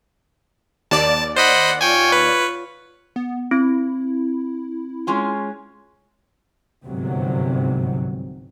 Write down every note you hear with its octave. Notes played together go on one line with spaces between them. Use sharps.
D#2 D5 A5
C5 D#5 F#5 B5
F4 C#5 G5 G#5
B4
B3
C4 E4
G#3 C#4 F4
G1 C2 G#2 C3 F#3